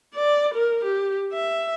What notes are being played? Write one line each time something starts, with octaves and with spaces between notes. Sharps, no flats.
D5
A#4
G4
E5